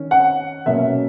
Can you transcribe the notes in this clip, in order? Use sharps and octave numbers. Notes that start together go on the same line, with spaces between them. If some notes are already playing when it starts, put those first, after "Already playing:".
Already playing: D#3 C#4
F#5
B2 F#3 A#3 C#4 E5